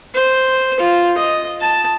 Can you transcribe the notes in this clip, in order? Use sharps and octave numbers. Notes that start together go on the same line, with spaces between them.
C5
F4
D#5
A5